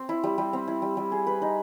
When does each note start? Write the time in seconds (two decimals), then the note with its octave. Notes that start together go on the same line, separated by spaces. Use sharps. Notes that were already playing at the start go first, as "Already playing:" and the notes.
Already playing: C4
0.09 E4
0.24 G3
0.38 G3
0.53 C4
0.68 E4
0.82 G3
0.97 G3
1.12 G#4
1.27 B4
1.42 D#4